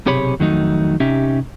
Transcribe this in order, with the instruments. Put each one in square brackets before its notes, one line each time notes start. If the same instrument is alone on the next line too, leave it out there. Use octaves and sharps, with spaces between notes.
[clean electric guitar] B1 C3 G4 G#4 C#5 B5
F2 D#3 F#3 A3 C#4 D#4
C3 C#4 D#4 G4 E5